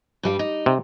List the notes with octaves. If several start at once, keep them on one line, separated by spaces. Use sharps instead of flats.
G2 G3 F5
D#4
C3